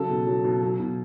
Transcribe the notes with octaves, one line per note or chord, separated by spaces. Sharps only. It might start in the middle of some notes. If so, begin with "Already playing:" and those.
Already playing: C#3 F#3 A4
B2
F#3
B2
F#3
B2